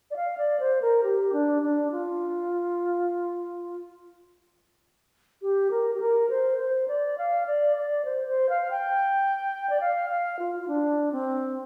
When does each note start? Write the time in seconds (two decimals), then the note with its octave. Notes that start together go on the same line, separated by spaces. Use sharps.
0.11 D5
0.16 F5
0.38 D5
0.60 C5
0.82 A#4
1.03 G4
1.33 D4
1.62 D4
1.91 F4
5.42 G4
5.71 A#4
5.94 G4
6.00 A#4
6.29 C5
6.58 C5
6.88 D5
7.18 F5
7.46 D5
7.76 D5
8.05 C5
8.27 C5
8.49 F5
8.71 G5
9.70 D5
9.80 F5
10.10 F5
10.39 F4
10.60 F4
10.68 D4
11.12 C4